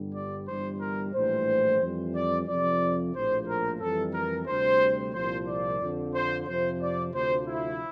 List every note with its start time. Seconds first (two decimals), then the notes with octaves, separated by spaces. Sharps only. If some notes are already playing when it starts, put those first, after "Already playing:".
Already playing: G1 G2 D3 G3
0.14 D5
0.48 G1 G2 E3 G3 C5
0.80 A#4
1.14 A#1 A2 E3 G3 C5
1.81 F2 E3 G3
2.14 D5
2.47 F2 C3 F3 D5
3.14 A#1 A2 F3 C5
3.47 A#4
3.80 F2 E3 G3 A4
4.14 A#4
4.47 D2 C3 G3 C5
5.14 C2 A#2 F3 C5
5.47 D5
5.81 F2 D3 F3
6.14 C5
6.47 F2 C3 F3 C5
6.81 D5
7.14 D2 C3 F3 C5
7.47 E4